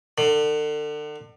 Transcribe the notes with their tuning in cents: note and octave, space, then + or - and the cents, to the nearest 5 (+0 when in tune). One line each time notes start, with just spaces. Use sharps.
D3 +35